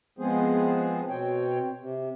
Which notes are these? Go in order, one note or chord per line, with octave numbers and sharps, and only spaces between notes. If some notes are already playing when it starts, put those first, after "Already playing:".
F3 G#3 B3 C4 G#4 C5
B2 C4 C#5 G5
C3